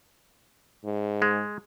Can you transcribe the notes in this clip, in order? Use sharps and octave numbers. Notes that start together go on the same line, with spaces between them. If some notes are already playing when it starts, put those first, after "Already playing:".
G#2
G#3